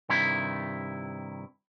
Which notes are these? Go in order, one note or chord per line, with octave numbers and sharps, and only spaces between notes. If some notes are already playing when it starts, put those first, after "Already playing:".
G2 C3 D#3 E4